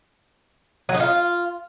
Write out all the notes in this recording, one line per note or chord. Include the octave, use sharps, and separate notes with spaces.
F#3
D#4
F4